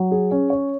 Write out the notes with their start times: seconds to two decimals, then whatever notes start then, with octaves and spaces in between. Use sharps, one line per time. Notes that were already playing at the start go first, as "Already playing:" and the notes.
Already playing: F#3
0.11 G#4
0.31 C#4
0.50 C#5